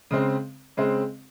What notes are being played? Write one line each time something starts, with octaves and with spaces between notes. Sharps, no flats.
C#3 G#3 C4
C#3 G#3 C4